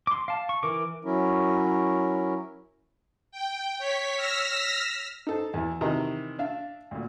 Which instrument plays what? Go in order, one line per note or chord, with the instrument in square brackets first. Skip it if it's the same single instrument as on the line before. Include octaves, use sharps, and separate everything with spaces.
[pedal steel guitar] C6 D6
F5 A5
C#6
E3 A#4 D6
[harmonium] F#3 C#4 E4 A#4
[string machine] G5
C#5 B6
E6 F6 A#6 B6
[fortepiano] D#4 A4 C5
E2 E3
C3 D#3 E3 D#5 A#5
D4 E5 F5
D2 A#2